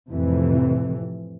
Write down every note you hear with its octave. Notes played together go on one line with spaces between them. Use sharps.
F2 A2 C3 E3